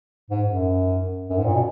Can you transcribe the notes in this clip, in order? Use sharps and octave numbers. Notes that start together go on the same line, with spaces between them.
G#2
F#2
F#2
G#2
A#2
B2